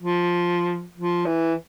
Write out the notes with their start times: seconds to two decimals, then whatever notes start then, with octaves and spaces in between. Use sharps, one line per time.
0.01 F3
0.95 F3
1.26 E3